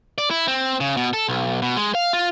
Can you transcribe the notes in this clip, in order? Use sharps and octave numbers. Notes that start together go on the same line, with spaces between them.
D5
E4
C4
C#3
B2
A4
B1
B2
G#3
F5
F4